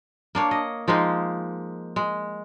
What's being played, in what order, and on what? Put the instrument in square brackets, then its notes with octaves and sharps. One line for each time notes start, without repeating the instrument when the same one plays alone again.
[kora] A#3 D4 C#5
D#5
F3 G#3 A#3 D#4
G#3